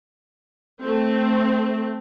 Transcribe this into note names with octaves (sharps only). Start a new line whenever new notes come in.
A3 C4